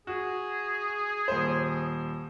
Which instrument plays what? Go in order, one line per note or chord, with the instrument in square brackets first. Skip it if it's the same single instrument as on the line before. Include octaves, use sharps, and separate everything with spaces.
[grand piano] F#4 [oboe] G#4
[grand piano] D#1 C5